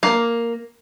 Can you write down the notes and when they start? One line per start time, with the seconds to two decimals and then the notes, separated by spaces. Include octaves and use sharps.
0.03 A#3